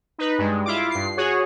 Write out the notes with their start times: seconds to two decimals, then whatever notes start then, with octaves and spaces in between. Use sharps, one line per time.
0.18 D#4 B4
0.38 G2 G#3
0.65 E4 F4 D6
0.90 G2 C7
1.17 F#4 G#4 C#5 F#5